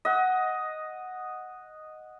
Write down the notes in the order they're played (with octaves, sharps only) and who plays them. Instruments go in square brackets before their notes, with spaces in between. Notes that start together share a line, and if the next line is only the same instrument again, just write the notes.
[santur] D#5 F#5